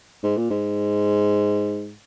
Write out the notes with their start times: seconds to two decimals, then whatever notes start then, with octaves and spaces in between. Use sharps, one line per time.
0.23 G#2
0.37 A#2
0.50 G#2